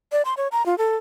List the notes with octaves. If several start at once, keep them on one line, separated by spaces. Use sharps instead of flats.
D5
C6
C#5
A#5
F4
A4